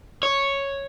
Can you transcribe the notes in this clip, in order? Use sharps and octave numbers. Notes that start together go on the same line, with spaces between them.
C#5